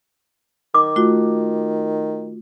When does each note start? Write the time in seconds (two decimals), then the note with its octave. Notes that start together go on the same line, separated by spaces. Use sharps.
0.74 D#3 D6
0.96 A3 F4 F#4